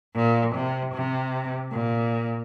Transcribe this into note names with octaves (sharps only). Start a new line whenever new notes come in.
A#2
C3
C3
A#2